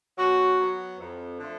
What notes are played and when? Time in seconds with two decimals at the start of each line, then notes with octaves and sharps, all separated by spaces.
0.18 B2 F#3 F#4
0.58 F#3 B3
0.98 F2
1.38 D3 F3 A3